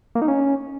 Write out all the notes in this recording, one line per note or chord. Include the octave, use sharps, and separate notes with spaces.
A#3
D#4
C#4